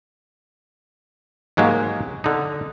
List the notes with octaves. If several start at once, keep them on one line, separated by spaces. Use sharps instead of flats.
G#2 F#3 G#3 A#3 G4
D3 D#4